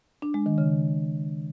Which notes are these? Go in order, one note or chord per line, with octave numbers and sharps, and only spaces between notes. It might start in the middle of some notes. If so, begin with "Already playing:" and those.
D4
G#3
D#3
C#3